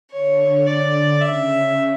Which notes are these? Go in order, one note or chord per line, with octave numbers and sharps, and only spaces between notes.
D3 C#5
D3 D5
C#3 E5